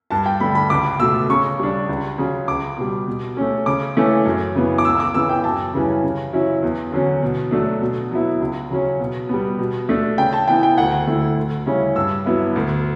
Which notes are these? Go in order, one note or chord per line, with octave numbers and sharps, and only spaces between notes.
G2 A5
G5
D3 A3 D4 B5
B5
C#2 D6
B2 A3 E6
C#3 C#6
G3 D4
C#2
C#3 F#3
C#2 D6
B2 G3
B2
A3 C#4
C#3 D6
E3 A3 C#4
F#2
C#3 E3 B3
D6
C#2 E6
D6
C#3 E3 B3 E6
G5
F#2 A5
C#3 E3 G3 C#4
C#3
F#3 C#4 E4
E2
D3 F#3 C#4
B2
F#3 A3 D4
B2
F#3 B3 E4
C#2
C#3 F#3 C#4
B2
G3 B3
B2
A3 D4
C#3 G5
A5
E3 B3 E4 G5
G5
D2 F#5
D3 A3 E4
D2
C#3 G3 C#4 E4
G2 E6
F#3 B3 E4
D2